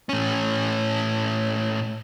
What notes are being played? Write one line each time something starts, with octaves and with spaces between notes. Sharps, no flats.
A2 C#4